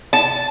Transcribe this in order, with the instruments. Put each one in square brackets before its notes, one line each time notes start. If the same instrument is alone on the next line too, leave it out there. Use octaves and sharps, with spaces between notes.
[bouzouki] A5